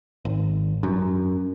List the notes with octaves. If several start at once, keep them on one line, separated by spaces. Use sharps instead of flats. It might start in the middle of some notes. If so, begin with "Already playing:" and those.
G#1
F#2